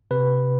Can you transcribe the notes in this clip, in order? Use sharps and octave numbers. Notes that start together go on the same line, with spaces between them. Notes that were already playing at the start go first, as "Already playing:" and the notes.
C3 B4